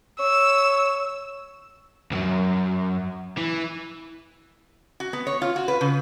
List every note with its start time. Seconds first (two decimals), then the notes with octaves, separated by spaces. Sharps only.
0.19 C#5 E6
2.11 C#2 F#2
3.38 E3
5.00 F#4
5.13 B3
5.27 C#5
5.42 F4
5.56 F#4
5.68 B4
5.81 C#3